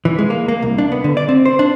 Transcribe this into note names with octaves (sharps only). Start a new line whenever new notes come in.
E3
G#3
A#3
A#3
C2
D4
B3
D3
D5
C4
C5
D4